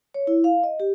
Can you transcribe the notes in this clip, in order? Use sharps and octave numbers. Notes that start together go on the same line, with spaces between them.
C#5
E4
F5
D#5
G4